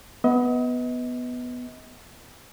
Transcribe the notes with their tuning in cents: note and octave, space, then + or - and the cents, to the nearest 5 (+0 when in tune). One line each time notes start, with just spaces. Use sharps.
B3 +0 D#5 +35